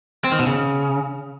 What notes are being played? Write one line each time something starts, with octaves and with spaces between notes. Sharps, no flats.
C4
D#3
B2
C#3